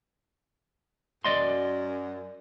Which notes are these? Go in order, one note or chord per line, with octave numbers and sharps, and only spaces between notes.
F#2 D5 D#5 C6